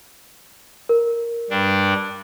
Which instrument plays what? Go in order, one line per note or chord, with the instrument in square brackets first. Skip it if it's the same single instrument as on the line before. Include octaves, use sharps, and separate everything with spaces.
[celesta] A#4
[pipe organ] G2 D4